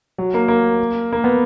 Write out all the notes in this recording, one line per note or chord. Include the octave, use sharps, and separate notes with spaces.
F#3
A#3
A#3
A#3
B3